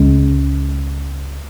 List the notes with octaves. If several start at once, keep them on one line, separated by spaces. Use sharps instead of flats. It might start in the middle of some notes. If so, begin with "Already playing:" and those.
Already playing: C#2 C#3 G#3 C#4